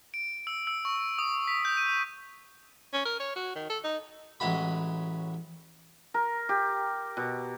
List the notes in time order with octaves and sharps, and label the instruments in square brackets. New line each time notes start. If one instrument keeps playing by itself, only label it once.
[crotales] D7
E6
E6
C#6
D#6
B6
G6
D#7
[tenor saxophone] C#4
A#4
C#5
F#4
D#3
A4
D#4
[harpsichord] A1 F#3 G#3 F#4 B5
[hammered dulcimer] A#4
G4
B2